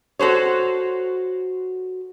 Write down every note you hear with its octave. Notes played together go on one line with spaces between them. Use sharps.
F#4 A4 C5 C#5